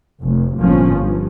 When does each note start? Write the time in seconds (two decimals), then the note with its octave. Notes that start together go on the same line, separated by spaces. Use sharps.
0.21 F1
0.58 G1 A#2 F3 C#4
0.96 G2